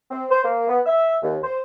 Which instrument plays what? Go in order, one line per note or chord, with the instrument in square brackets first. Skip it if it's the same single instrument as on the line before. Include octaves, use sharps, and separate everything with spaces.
[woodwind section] C4
C5
A#3
B3
E5
D#2
C5